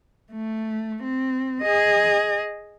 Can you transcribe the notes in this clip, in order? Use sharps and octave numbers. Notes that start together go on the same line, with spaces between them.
A3
C4
G#4 D#5